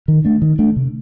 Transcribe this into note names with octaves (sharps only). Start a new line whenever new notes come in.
D#3
A3 D4
D#3
A3 D4
C3